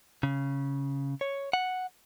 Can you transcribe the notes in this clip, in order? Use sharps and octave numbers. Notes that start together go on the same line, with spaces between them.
C#3
C#5
F#5